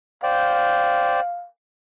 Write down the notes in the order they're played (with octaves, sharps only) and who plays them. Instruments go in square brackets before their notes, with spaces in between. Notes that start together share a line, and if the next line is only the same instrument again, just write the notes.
[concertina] C5 D5 G5 [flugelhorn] F5